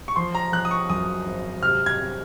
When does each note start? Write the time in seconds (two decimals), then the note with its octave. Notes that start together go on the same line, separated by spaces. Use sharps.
0.08 C#6
0.16 F3 C6
0.35 A#5
0.52 F3 F#6
0.65 D#6
0.71 C#6
0.90 F#2 D#6
1.26 G#1
1.63 C3 F6
1.86 G#6
1.99 C3